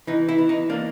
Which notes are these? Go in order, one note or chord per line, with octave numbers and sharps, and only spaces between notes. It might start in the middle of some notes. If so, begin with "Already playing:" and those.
E3 D#4
E4
E3
D#4
A#3 D4